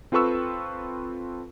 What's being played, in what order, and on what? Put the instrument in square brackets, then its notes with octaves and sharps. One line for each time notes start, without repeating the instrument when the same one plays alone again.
[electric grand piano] C4 F4 A4 B4 C#6 E6